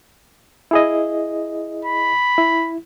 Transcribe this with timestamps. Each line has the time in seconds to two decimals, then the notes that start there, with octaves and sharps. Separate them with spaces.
0.71 E4 G#4 D#5
1.85 B5
2.38 E4